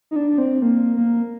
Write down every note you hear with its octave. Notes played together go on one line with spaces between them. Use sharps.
D#4
D4
D4
C4
A#3
A#3